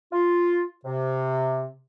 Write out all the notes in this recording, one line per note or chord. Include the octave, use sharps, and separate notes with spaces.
F4
C3